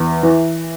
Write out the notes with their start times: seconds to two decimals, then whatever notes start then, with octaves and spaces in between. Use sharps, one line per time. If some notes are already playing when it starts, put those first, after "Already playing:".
Already playing: E2
0.23 E3